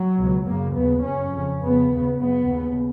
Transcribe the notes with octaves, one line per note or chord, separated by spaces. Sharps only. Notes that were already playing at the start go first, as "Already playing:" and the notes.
Already playing: F#3
C#2 B2
F#2 C#3 A#3
D#2 C#3 B3
F#2 C#3 C#4
F2 C#3
F2 C#3 B3
D#2 C#3
F#2 C#3 B3
D#2 C#3